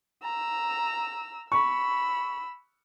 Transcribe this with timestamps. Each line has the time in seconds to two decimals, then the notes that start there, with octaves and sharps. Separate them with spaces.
0.24 A#5 E6
1.52 B5 C#6 E6